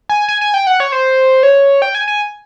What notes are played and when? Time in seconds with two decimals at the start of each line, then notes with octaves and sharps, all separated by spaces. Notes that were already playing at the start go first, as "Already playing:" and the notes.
0.09 G#5
0.29 G#5
0.41 G#5
0.54 G5
0.67 F#5
0.80 C#5
0.92 C5
1.43 C#5
1.82 G5
1.95 G#5
2.08 G#5